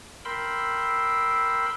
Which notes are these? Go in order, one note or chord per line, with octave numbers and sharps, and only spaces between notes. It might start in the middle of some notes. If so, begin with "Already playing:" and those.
A#4 G5 B5 C6 E6